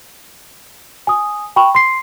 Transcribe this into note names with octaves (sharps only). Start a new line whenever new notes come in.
G#5 D#6
G5 B5 C#6
C6 C7